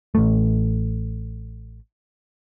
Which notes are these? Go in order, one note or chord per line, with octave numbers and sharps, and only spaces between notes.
A1 A3